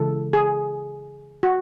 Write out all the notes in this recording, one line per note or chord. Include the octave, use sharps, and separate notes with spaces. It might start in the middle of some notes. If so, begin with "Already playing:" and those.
Already playing: C#3 E3 G#3 A4
G#4
F#4